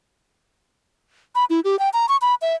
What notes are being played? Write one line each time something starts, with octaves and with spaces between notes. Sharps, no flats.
B5
E4
G4
G5
A#5
C#6
B5
E5